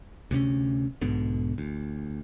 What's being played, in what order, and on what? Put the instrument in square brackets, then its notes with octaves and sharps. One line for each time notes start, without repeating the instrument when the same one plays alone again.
[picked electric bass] D2 C3 B3 C#4
B1 G#2 B2 D3
D2